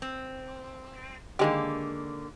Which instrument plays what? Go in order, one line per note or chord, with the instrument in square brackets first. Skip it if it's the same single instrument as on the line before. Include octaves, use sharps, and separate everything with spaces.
[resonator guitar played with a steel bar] C4
[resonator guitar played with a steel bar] D3 D#3 A#3 [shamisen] G#3 G4